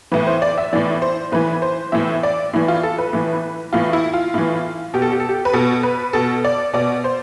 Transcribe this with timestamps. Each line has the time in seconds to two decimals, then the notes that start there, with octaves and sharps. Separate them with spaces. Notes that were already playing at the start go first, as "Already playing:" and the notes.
0.12 A2 E3 B4
0.27 C5
0.42 D5
0.58 E5
0.73 A2 E3 D5
1.02 C5
1.32 A2 E3 B4
1.62 C5
1.92 A2 E3 E5
2.23 D5
2.53 A2 E3
2.68 F4
2.83 A4
2.98 B4
3.13 A2 E3
3.73 A2 E3 F4
3.93 E4
4.14 F4
4.34 A2 E3
4.94 B2 G4
5.02 A4
5.12 G4
5.20 A4
5.29 G4
5.45 B4
5.53 B2 A4
5.83 B4
6.13 B2 A4
6.45 D5
6.74 B2 D5
7.04 C5